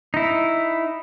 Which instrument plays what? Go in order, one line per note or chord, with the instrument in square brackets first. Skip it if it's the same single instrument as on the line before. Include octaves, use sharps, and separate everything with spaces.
[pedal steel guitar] D#4 E4